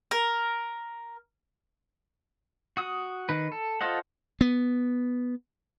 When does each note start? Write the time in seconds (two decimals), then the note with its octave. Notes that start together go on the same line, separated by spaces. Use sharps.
0.11 A#4
2.77 F#4 D#6
3.29 D#3 B4
3.52 A4
3.81 F4 A4 C5 D#5 F#5
4.41 B3